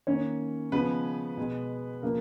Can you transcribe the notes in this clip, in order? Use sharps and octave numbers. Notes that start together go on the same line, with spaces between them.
D#3 A#3 C#4 C#5
C#3 F3 G#3 B3 B4
B2 G#3
C#3 F3 A#3 A#4